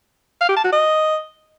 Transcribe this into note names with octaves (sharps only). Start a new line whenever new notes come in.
F5
G4
A5
F#4
D#5